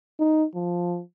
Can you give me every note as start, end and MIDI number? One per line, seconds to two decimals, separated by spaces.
0.19 0.45 63
0.55 1.01 53